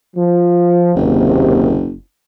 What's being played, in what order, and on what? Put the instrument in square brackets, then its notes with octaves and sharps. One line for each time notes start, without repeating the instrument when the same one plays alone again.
[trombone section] F3
[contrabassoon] F#1 [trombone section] D#2 C3